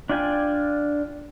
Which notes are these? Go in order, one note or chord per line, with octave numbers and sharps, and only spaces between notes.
D4 F4 G5 G#5